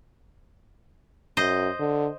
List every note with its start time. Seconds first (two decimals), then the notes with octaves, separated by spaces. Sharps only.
1.37 F#2 C5 D#5
1.79 D3